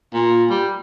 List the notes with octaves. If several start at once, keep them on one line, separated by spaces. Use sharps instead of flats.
A#2
G3